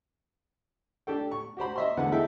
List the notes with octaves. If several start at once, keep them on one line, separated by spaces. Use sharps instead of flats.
D4 G4 A4 G5
C#6
F#4 G4 C5 B5
D#5 E5 C6
E2 D3 D4 B4 F#5
D#4 E4 G#4 A4 E5 G5